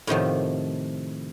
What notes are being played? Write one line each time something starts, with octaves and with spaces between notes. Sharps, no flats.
A2 C3 D#3 F3